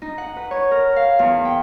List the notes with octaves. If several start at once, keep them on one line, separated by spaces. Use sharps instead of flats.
D#4
F#5
B4
C#5
A#4
F5
E2
G5